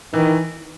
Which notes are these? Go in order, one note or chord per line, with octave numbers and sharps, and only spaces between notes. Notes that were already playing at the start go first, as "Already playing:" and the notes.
D#3 E3